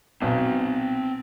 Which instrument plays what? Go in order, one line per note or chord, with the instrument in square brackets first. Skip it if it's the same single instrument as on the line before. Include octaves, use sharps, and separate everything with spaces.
[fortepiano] B1 [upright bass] A#2 G#3 [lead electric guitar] C4 G#5